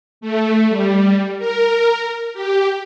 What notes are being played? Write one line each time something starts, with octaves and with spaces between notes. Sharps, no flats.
A3
G3
A#4
G4